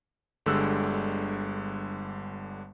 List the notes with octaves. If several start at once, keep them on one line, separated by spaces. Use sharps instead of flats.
G1 D3 G3 G#3 E6 F#6